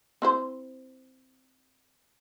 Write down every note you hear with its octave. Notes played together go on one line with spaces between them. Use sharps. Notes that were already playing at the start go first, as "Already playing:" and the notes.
C4 E4 C5